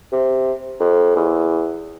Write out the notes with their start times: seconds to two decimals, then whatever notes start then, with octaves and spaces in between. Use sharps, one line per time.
0.12 C3
0.80 F2
1.16 E2